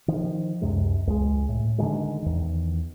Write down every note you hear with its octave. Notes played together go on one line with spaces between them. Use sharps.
D#3 F3
C#2 F#2 C3 G#3
C#2 G#3
A2
D3 D#3 F#3 G#3
E2 D#3